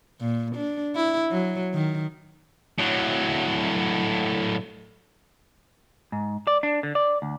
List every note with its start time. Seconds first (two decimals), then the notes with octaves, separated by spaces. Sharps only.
0.21 A#2
0.56 D4
0.96 E4
1.31 F#3
1.74 D#3
2.78 A2 F#3
6.12 G#2
6.47 D5
6.63 D4
6.83 D3
6.95 D5
7.22 D2